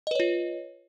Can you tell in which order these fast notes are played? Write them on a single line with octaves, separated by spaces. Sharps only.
D#5 B4 C#5 F4